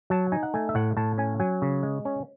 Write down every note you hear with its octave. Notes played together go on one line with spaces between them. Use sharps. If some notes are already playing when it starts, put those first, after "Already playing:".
F#3 A5
D#4 G#5
F#5
A3 G#5
E5
A2 F#5
A2 A5
C#4 G#5
F#3 G#5
C#3
G#3
C#4